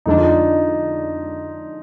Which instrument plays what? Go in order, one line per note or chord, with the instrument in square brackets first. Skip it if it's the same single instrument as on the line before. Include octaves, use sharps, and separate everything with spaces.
[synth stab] F2 D3 G#3 D4 [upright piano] D#4
[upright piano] F4
D#4